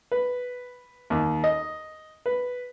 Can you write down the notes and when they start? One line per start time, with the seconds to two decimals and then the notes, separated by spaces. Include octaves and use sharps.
0.12 B4
1.10 D#2
1.44 D#5
2.26 B4